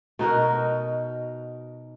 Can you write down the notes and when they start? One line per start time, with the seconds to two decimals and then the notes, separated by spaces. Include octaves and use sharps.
0.19 B2 D#4 F#4 A#4